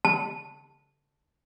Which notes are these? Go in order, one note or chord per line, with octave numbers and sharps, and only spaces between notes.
A5